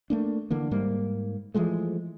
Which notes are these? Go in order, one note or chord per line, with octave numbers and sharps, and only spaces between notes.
A3 A#3 D4
D3 E3 A#3
G#2 G3 A#3
E3 F3 G#3 A3